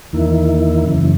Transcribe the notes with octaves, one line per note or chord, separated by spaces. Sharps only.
E2 D#3 A#3 E4
F#2 C#3 E3